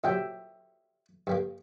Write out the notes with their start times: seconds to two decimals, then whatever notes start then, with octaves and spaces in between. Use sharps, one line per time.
0.04 A#2 F#3 G3 E5 G5
1.27 G2 G3 A#3